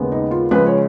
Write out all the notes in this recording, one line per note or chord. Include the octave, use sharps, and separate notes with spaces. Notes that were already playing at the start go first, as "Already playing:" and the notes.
Already playing: D#2 C#3 G#3 B3
D#4
F4
C#2 C#3 F3 G#3 B4
C#5